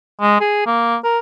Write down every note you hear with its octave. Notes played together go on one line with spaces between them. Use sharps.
G#3
G#4
A#3
A#4